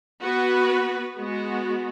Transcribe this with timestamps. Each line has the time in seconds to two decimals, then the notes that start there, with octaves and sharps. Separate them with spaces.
0.23 B3 F#4 B4
1.18 G#3 B3 F#4